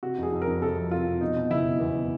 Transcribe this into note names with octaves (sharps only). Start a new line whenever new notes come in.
C3 F#4
F2 G#4
F2
A#4
F2
C3 A4
F3
C3 F4
C3
B2 D#4
B2
F#1 E4
B2
E2
B2